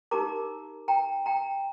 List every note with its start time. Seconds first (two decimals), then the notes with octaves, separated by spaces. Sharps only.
0.11 D#4 G4 A#4 A#5 D6
0.88 G5 A#5
1.26 G5 A#5